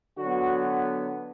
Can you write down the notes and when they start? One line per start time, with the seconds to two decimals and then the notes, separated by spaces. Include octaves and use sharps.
0.18 D3 F#3 B3 F#4